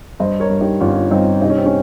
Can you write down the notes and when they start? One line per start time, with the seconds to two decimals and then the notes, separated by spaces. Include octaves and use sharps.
0.20 G2 C5 D#5
0.40 A#4 C#5
0.50 G2
0.61 D#4 G4
0.80 G1 C#4 F4
1.11 G2 C4 D#4
1.42 C3 D#4
1.50 C#4
1.58 C4
1.66 C#4